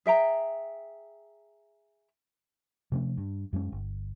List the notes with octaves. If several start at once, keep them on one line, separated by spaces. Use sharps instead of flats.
G#4 E5 G5 A#5
C3 F3 A3 C#4
G2
F#2 G3 G#3 C#4
G1